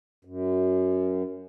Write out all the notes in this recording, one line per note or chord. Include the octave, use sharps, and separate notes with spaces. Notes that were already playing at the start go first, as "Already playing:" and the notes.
F#2